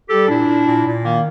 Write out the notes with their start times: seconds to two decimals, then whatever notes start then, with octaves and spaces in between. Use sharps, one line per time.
0.09 G3 G4 A4
0.28 A#2 D4 E4
0.47 A#2
0.66 A#2
0.85 A#2
1.04 D#3 A#3